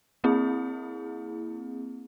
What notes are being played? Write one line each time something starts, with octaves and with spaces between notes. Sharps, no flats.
A#3 C4 E4 G#4